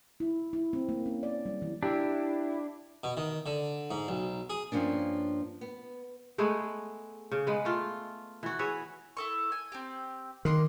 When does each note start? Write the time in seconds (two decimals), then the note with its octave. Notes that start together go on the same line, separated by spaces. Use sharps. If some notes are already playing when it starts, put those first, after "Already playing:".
0.20 E4
0.53 E4
0.73 C4
0.89 A#3
1.06 C#4
1.23 D5
1.46 G3
1.62 E3
1.83 D4 E4 G4
3.04 B2
3.17 D#3
3.46 D3
3.91 G#2
4.08 B1
4.50 G#4
4.72 G2 F3 A#3 C#4 D4
5.61 B3
6.38 G#3 A3 B3 G#4
7.32 C#3
7.47 G#3 B3
7.65 A3 F4
8.43 E3 F#4
8.59 G#4 B4 C#5 E5
9.17 E4 A4 C#6
9.52 G#5
9.72 C4 G4
10.45 D#3 A#3 C6 F#6